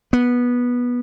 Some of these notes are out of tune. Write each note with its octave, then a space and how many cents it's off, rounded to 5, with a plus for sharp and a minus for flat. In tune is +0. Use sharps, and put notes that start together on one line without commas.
B3 -15